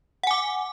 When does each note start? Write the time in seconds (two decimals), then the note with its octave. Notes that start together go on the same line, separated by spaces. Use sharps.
0.23 F#5
0.27 G#5
0.31 D6